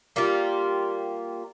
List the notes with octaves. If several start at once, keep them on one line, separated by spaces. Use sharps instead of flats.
G3 A#3 F4